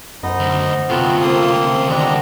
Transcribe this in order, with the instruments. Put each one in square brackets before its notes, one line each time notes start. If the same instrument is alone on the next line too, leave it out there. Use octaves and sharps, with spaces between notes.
[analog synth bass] F#2 [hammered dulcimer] B3 C5 [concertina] D#4 D#5
[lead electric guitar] D2
[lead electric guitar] D2 C3 [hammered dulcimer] A3 [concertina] B3 C4 F#4 [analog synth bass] F4
[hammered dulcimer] A3 C4 [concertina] A#3 C6 D#6
[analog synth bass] D#3 [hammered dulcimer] G3 F5 F#5 [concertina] D4 D#5 A#5